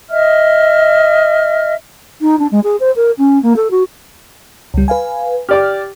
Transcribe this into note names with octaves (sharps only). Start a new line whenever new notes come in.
D#5 E5 F6
D#4
D4
G#3
G#4
C5
A#4
C#4
A#3
A4
F#4
C#2 G3
B4 F5 G#5
G4 D5 D6 F6